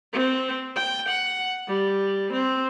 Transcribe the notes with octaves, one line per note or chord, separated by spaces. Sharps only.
C4
G5
F#5
G3
C4